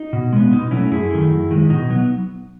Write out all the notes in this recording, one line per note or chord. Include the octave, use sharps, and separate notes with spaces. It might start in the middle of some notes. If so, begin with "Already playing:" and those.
Already playing: D#4
B2
G#3 B3
B2 D#4
F#3 A3 C#4 E4
F#2 E4 G#4
D#3 A3
F#2
D#3 G#3
B2 D#4
F#3 B3